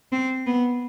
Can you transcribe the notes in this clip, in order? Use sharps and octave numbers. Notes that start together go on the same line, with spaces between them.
C4
B3